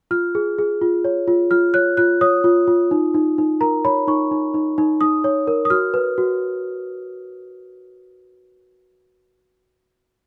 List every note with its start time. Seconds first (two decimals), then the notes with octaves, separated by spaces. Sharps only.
0.11 F4 F6
0.35 G#4
0.58 G#4
0.82 F4
1.05 C#5
1.28 F4
1.51 F4 F6
1.74 C#5 F#6
1.97 F4 F#6
2.21 C#5 D#6
2.44 F4
2.67 F4
2.91 D#4
3.14 D#4
3.38 D#4
3.61 A#4 A#5
3.85 C#5 B5
4.07 D#4 C#6
4.31 D#4
4.54 D#4
4.78 D#4
5.01 D#4 D#6
5.24 C#5
5.47 A#4
5.65 D#6
5.70 F#4 F6
5.94 B4
6.18 F#4